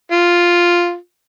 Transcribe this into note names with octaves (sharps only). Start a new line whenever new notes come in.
F4